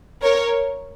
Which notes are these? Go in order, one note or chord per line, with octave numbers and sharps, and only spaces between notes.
A#4 C#5